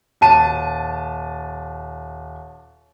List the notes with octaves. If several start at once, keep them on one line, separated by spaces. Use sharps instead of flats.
D#1 A5 D#7